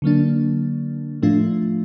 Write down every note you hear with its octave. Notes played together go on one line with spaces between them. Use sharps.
D3 F#3 A#3 D4
A2 F3 A3 D4 F4